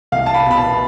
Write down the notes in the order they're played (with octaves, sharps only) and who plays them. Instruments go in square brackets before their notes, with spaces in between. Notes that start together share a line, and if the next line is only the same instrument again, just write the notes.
[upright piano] C2 F5
A5
B5
B2 B5
A5